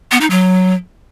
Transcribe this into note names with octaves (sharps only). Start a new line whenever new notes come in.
B3
D#4
F#3